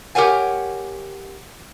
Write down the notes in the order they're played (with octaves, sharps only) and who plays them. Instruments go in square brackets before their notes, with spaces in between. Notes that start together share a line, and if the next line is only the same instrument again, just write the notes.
[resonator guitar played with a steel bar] G4 A#4 C#5 F#5 G#5